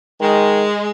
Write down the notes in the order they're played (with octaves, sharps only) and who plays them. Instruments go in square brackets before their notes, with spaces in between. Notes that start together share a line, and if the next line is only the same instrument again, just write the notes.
[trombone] D#3 [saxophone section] G#3